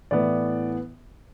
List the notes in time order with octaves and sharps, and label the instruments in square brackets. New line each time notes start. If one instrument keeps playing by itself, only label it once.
[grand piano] A2 E3 B3 D5